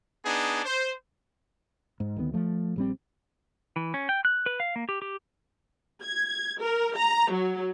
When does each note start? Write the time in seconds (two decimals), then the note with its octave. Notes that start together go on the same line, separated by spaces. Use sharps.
0.25 B3 D4 D#4 G#4
0.65 C5
2.00 G#2
2.17 D2 D#3 G#3 B3
2.34 F3 A3
2.76 A#1 G3 C4
3.76 E3
3.94 C#4
4.09 G5
4.25 F#6
4.46 B4
4.60 F5
4.76 A#3
4.89 G4
5.02 G4
6.02 G#6
6.61 A#4
6.97 A#5
7.31 F#3